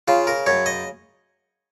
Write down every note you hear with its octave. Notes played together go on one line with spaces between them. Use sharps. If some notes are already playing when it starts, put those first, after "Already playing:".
C#3 F4
A#4
F#2 C#5
D#5